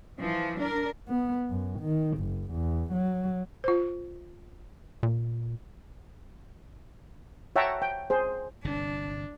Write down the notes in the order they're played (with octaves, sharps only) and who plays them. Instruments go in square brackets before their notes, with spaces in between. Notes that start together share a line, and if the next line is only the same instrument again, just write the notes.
[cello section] E3 F3
D4 A#4
[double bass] B3
F#2
D#3
F#1
E2
F#3
[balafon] F4 C5
[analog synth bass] A#2
[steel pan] C#5 E5 F#5 G5 A5 A#5
G5
G#4 C5
[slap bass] G1 C3 [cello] D4